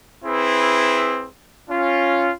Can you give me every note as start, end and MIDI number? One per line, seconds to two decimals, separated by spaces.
0.24 1.26 60
0.24 1.26 64
0.24 1.26 68
0.24 1.26 71
1.70 2.32 61
1.70 2.32 65